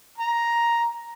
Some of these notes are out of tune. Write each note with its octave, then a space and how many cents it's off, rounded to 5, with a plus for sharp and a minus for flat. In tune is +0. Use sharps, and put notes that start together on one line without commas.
A#5 +5